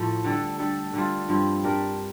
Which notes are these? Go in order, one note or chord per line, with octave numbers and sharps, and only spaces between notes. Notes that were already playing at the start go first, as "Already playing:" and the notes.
Already playing: A2 F3 A3
D3 G3 D4 A4
G3 D4 A4
D3 G3 D4 F4
G2 F3 C4
G3 D4 G4 A#4